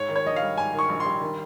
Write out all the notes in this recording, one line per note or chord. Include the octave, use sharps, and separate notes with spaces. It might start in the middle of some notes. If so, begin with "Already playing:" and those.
Already playing: G#2 C#5
D#3
C#5
A#1 D#5
F5
G3
G#2 G#5
D#3
C#6
A#1
C6
G3
D#3